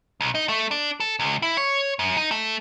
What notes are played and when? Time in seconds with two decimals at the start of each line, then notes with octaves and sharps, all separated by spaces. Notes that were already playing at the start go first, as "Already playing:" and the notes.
0.21 B1
0.35 D#4
0.49 A3
0.71 D4
1.00 A4
1.20 C#2
1.42 E4
1.57 C#5
1.99 F#2
2.17 D#4
2.31 A3